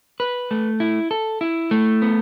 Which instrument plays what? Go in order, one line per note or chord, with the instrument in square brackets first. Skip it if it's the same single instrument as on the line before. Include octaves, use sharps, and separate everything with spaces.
[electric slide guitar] B4
A3
E4
A4
E4
A3
B3